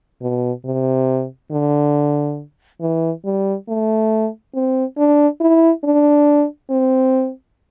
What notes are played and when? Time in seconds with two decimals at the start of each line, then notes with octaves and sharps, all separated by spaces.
0.22 B2
0.65 C3
1.51 D3
2.81 E3
3.25 G3
3.68 A3
4.54 C4
4.97 D4
5.41 E4
5.84 D4
6.70 C4